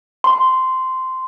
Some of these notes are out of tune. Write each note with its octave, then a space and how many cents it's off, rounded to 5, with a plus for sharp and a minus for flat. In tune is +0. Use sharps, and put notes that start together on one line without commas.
C6 -10